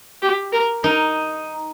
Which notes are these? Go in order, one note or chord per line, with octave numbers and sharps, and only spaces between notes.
G4
A#4
D#4 A#4